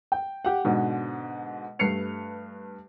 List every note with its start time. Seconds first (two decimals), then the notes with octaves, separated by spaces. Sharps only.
0.12 G5
0.45 G4 F#5
0.65 G#2 B2 D3
1.79 G2 A3 B4 C7 C#7 F7